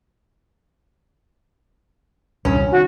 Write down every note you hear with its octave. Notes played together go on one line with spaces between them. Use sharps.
D#1 C2 G2 C#4
D#3 F#4